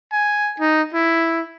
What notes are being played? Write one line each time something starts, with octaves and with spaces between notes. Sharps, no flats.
G#5
D#4
E4